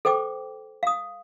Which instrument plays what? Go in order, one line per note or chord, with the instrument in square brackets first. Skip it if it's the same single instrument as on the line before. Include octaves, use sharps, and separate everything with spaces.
[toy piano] A4 C5 G5 D6
F5 D#6